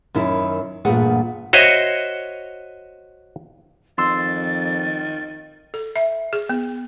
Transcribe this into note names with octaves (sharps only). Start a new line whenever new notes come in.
F#2 D#3 E4
E2 G2 A#2 A3 G#4 F#5
F#4 C5 C#5 D#5 E5
F2 D#3 C6 E6 A6
A4
E5
G#4
B3